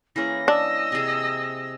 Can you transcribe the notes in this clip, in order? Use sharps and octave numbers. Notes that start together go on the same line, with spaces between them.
E3 A#3 C#4 G#4 A#6
D4 D#5 E6
C3 G#4